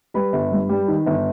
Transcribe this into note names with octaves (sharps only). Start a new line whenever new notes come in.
G3 B4 B5
G1
G2
G3
D#3
G1